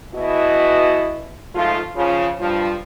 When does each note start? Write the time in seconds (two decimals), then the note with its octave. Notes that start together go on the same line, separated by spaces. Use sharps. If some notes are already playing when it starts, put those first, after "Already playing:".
0.14 E2 B2 E3 E4 F#4 D#5
1.55 G#2 F3 A3 F4
1.96 C#3 F3
2.40 G2 F3